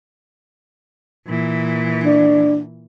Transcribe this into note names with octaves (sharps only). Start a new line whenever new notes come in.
A#2 E3
D4